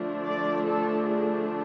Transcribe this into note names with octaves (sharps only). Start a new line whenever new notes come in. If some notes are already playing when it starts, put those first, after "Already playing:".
Already playing: D3 F3 A3 D4
D5
A4
G#4